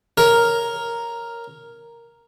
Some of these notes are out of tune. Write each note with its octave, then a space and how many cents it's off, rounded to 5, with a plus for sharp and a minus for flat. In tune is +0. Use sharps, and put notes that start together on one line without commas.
A#4 +0 C#5 +0